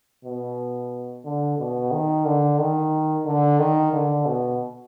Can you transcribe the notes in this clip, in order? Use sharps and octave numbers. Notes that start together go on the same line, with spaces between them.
B2
D3
B2
D#3
D3
D#3
D3
D#3
D3
B2